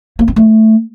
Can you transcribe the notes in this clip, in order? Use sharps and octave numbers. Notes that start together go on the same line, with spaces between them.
A#3
C4
A3